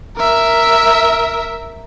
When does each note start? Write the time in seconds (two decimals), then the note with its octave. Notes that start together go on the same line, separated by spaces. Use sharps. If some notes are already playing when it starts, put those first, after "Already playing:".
0.16 A#4 E5